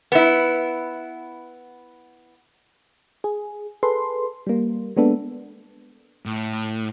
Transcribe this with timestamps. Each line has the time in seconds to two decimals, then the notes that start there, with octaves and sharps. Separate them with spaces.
0.12 B3 E4
3.24 G#4
3.83 G#4 A4 B4 C6
4.47 G3 A#3
4.96 G#3 A#3 B3 D4 A4
6.26 A2